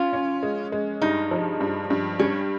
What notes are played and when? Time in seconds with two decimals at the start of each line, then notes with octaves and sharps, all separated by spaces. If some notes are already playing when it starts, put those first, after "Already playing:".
Already playing: C#4 F4
0.13 C#4
0.43 G#3
0.72 G#3
1.02 G2 D#4
1.31 F3
1.60 G2
1.90 G2
2.19 G3 C#4